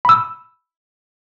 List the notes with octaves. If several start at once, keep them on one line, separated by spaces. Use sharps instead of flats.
B5 E6